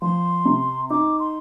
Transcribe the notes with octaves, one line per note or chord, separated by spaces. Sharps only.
F3 C6
C3
D#4 D6
C6